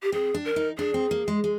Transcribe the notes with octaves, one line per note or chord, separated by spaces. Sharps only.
G4
C4 G#4
D4
A#4
D#4
D4 G#4
C4
A#3
G#3
G#3